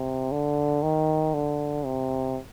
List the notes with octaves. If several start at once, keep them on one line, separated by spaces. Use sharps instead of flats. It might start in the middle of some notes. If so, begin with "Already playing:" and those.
Already playing: C3
D3
D#3
D3
C3